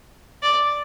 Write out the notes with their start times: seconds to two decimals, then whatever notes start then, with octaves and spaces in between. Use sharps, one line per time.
0.43 D5